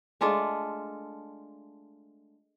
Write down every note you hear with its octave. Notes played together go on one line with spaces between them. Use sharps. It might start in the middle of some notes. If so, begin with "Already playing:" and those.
G#3 A3 D4 F4